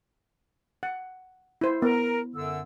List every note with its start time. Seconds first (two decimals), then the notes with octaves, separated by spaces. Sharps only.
0.83 F#5
1.61 E4 C5
1.82 B3 A#4
2.36 F#2 D3 E6